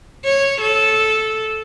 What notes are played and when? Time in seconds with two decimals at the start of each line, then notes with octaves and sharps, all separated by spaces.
0.25 C#5
0.61 A4